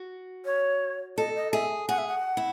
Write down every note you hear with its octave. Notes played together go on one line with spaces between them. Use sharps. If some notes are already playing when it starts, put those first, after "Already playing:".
Already playing: F#4
C#5
A4 D#5
D#5
G#4 E5
G#4 F#5
E5
F#5
E4